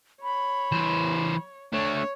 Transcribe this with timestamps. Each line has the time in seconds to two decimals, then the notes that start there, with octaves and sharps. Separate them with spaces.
0.23 C#5 B5
0.72 E3 C5
1.73 A3 D4 C#5